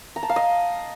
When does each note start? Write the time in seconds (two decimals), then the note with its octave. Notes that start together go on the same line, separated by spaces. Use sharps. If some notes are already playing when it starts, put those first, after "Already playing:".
0.16 A#5
0.23 A5
0.29 F5
0.36 D#5